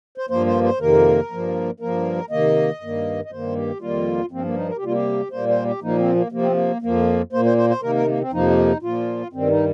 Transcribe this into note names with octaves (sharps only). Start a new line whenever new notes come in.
C5
G2 F3 A#3 C5
C5
C5
F2 C3 D#3 A#3 A#4
G2 F3 A#3
G2 F3 A#3 A#4
C3 D#3 A#3 D#5
G2 D#3 A#3
D#5
G2 D#3 A#3 C5
G4
F2 D#3 G3 A#3 F4
G2 F3 A#3 C4
A#3
D#4
A#4
G4
C3 G3 A#3 F4
G4
A#2 G3 A#3 C5
C5
G4
A#2 F3 A#3 D#4
C4
A#3
C3 F3 A#3
C4
A#3
F2 F3 A#3
A#2 A#3 C5
C5
C5
C5
C3 D#3 A#3 A#4
A#4
A#3
C4
F2 C3 F3 A#3 D#4
A#2 F3 A#3 F4
G2 D#3 G3 C4
D#4